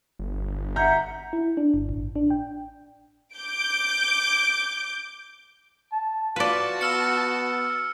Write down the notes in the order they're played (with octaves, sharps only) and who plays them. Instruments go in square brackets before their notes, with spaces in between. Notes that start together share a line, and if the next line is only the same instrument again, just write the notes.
[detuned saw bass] G1
[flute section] E5 F#5 [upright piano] A#5 G6
[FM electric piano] E4
D4
G1
A1
D4
G5
[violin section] D6 G6 D7
[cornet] A5
[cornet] F4 [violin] F#4 A5 [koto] B4 D5
[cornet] B3 [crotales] E6 F6 C#7